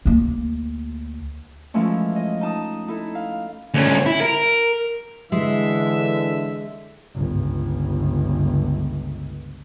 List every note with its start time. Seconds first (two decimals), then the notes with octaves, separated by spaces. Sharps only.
0.05 D2 A#3
1.74 E3 F3 G#3 A3 C#4
2.16 D#5
2.41 D#4 A5 D#6
2.88 D#4 E4 A4
3.15 F5
3.74 D2 C#4
4.06 E4
4.21 A#4
5.32 D3 E3 G#3 E5
7.15 G1 C#2